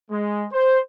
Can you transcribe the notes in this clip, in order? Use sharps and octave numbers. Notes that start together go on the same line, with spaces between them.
G#3
C5